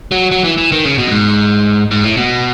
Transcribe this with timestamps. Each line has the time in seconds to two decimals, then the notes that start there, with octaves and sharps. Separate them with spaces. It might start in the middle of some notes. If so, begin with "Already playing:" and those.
0.12 F#3
0.31 F#3
0.44 E3
0.58 E3
0.72 D#3
0.85 C#3
0.98 B2
1.07 F#2
1.11 G#2
1.91 G#2
2.04 A2
2.17 B2